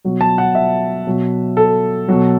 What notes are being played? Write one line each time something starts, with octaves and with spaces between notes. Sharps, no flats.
B2 F#3
A5
F#5
E5
B2 F#3
A4
B2 F#3